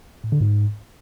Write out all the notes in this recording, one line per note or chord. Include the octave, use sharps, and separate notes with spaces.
A2
D3
G#2